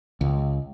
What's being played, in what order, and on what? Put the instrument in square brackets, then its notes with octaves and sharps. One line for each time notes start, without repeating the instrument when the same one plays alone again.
[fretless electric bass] C#2